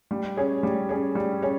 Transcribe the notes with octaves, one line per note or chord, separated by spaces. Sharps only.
G3
C#4 G#4 C#5
G3
C#4 G#4 C#5
G3
C#4 G#4 C#5